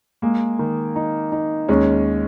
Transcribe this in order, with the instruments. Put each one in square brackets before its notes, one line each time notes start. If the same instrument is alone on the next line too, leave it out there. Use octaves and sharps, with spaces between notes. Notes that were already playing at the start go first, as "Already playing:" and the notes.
[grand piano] G#3 [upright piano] A#3
[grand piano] D#3
D#4
D#4
[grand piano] D#2 [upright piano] G#3 C#4